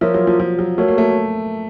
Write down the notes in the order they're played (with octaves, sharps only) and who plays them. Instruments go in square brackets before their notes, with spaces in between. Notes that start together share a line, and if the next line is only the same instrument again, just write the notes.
[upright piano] F3 [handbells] F4 A#4 C#5 E5
[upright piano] F#3
F3
F3
F#3
[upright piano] A3 [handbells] F#4 A#4 C#5
[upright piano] A#3
A3